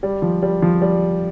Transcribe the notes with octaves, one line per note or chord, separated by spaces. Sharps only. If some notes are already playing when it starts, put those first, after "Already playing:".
G3
F3
G3
F3
G3